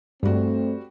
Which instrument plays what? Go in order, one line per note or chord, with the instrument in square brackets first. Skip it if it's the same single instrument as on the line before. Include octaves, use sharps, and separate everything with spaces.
[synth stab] G2 [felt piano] G3 F#4 [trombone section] A3 C4